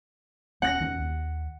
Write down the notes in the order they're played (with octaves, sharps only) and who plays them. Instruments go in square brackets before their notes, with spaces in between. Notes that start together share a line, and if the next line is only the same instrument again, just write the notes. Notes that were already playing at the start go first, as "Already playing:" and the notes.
[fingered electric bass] D#1 B3 C#4 [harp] F#5 A#6
[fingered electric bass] E2 D#3 C#4
D#2